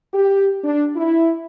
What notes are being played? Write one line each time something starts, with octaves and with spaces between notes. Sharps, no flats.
G4
D4
E4